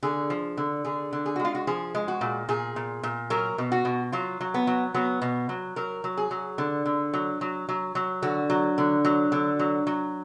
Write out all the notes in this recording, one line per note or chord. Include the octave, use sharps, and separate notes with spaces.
D3 G#4
F3
D3
D3 G#4
D3
G#4
F#4
G#3
F4
F#4
F3 G#4
G#3
F#4
A#2
A#2 G#4
A#2
A#2
F#3 A#4
B2
F#4
B2
F#3 F4
F#3
B3
F#3
F#3 B3
B2
F#3
F#3 A#4
F#3
G#4
F#3
D3
D3
F#3
F#3
F#3
F#3
D3 F#4
F#3
D3
F#3
D3
F#3
F#3